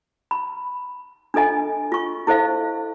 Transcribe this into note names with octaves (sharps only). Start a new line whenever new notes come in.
B5
D4 F4 A4 D#5 G#5
F4 C#6
E4 A4 C5 D#5 F5